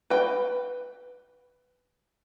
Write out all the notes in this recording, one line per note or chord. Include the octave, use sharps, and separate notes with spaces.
B4 G5